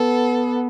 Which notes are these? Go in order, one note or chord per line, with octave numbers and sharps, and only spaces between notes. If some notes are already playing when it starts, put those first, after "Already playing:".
Already playing: B3 A4